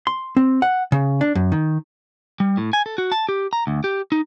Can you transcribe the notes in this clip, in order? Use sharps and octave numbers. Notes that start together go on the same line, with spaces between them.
C6
C4
F#5
C#3
D4
F#2
D#3
G3
A2
G#5
A4
F#4
A5
G4
A#5
D2
G4
D#4